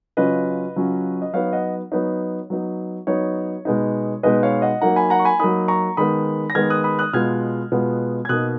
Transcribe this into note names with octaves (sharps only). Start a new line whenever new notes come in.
C#3 F#3 C#4 F4 B4 D#5
C#3 F#3 C#4 F4
D#5
F#3 B3 D#4 C#5 F5
D#5 F#5
F#3 B3 D#4 C#5
F#3 B3 D#4
F#3 B3 D#4 C#5
B2 G#3 B3 D#4
B2 G#3 B3 D#4 B4 D#5
C#5 F5
D#5 F#5
F#3 A#3 D#4 F#5 A#5
G#5 B5
F#5 A#5
C#6
G#5 B5
F#3 A#3 D#4 B5 D#6
A#5 C#6
D#3 G#3 B3 B5 D#6
A#6
D#3 G#3 B3 F6 G#6
D#6 F#6
B5 D#6
D#6 F#6
B2 G#3 B3 F4 F6 G#6
B2 G#3 B3 F4
G#6
B2 A#3 D#4 D#6 F#6